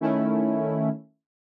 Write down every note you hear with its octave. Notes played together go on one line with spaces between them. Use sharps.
D#3 A3 C#4 E4